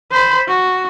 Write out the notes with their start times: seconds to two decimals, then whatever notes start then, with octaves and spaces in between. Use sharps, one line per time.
0.11 C5 B5
0.48 F#4